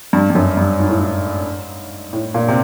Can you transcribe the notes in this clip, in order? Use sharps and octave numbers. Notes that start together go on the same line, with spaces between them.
G2
G2
F#2
G2
G#2
A2
G#2
A2
A#2
C3